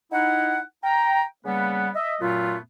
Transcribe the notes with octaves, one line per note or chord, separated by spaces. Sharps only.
D#4 E4 F#5
G5 A#5
C#3 G3 A#3 B3 B4 F#5
D#5 E5
F#2 A#2 F#3 A3 B3 F4